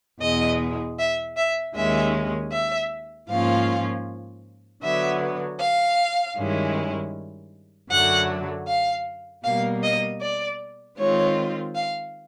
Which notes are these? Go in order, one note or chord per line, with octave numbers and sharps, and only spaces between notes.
E2 B2 G#3 D#5
E5
E5
D#2 D#3 G#3 C#4 E5
E5
G#2 F3 A#3 C#4 F4 F5
D3 F#3 B3 E5
F5
G2 D#3 G#3 C#4 E4
F#2 D3 F#3 A3 F#5
F5
B2 G3 A#3 F5
D#5
D5
D#3 G#3 C4 F4 C#5
F5